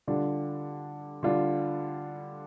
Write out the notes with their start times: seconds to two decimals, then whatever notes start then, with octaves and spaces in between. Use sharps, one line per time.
0.07 D3 G3 D4 F4
1.23 D3 G3 D4 F4